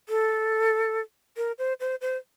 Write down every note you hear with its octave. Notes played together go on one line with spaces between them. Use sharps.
A4
A#4
C5
C5
C5